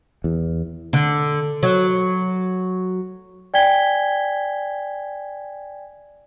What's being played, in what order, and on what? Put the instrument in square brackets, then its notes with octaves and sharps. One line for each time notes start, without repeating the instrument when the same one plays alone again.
[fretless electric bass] E2
[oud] D3
F#3
[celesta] D5 G5 G#5 G#6 B6 G7